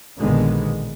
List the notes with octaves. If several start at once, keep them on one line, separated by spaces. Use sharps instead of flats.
A#1 B2 D3 D#3 G#3 B3